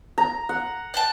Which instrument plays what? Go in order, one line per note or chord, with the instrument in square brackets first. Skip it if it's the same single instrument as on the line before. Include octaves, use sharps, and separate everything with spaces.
[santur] A#5
F#5
[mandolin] D5 G5 A5